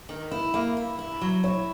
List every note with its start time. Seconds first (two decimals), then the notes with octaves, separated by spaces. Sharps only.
0.09 D#3
0.31 E4
0.54 A#3 E5
0.77 E4
0.99 E4
1.21 F#3
1.44 E4 C#5